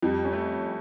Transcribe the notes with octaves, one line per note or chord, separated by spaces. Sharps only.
F2 G3
C#4
A3